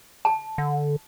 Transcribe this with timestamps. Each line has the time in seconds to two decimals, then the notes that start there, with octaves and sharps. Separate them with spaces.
0.25 A5
0.58 D3